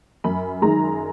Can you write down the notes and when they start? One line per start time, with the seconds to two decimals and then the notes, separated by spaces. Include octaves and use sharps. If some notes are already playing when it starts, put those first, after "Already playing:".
0.24 F#2 B5
0.62 D#3 G#3 A#5